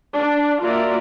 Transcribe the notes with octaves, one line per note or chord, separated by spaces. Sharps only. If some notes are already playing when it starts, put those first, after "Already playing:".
D4
A#3 F4 F#4 A#4 D5 E5